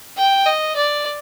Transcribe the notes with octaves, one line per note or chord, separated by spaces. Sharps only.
G5
D#5
D5